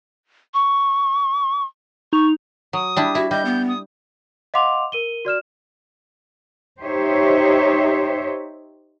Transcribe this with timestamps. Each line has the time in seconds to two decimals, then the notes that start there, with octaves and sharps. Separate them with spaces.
0.54 C#6
2.13 D#4 C#6 F7
2.73 F#3 D#6
2.97 G3 D4 E4
3.15 E4 F#4
3.31 G3 D#5 G6
3.45 B3
3.68 D#6
4.54 D#5 F5 F#5 C6 D6 F7
4.92 A#4 D#7 G7
5.25 F#4 D5 F6 E7
6.81 D#4 G4 C5 C#5 E5